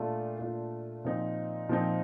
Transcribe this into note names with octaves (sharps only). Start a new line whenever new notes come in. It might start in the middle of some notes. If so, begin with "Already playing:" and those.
Already playing: A#2 A3 D4 F4
A#2 A3 D4 F4
A#2 F3 C4 D#4
A#2 F3 C4 D#4